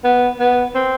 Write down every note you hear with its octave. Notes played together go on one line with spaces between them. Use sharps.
B3
B3
C4